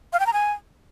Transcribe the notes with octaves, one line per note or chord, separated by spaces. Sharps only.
F5
G5
A#5
G#5